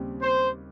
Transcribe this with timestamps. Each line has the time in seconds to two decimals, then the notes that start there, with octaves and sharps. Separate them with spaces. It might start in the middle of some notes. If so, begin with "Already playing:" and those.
Already playing: D#2 C#3 G3 C4 G4
0.21 C5